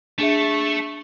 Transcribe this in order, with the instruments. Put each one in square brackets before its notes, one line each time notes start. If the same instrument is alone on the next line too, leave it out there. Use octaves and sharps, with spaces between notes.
[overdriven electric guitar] A3 [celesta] D4 G#4 E5